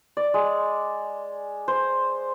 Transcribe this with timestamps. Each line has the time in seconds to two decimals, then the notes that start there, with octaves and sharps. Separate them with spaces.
0.17 D5
0.34 G#3
1.68 C5